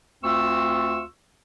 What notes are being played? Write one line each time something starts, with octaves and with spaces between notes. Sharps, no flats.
D2 C4 F4 C#6 E6